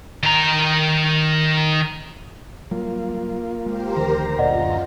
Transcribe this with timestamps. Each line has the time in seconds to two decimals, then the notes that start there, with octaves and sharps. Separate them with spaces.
0.23 D#3 A#5
2.71 F#3 G3 A#3 F4
3.66 G#3 G4 A#4 C5
3.97 D2 D#3 F3 A3 A#5
4.38 F#2 A#2 F4 D5 D#5 F#5